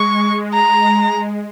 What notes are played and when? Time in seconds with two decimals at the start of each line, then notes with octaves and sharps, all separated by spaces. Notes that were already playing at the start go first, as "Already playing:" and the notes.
Already playing: G#3 C#6
0.54 A#5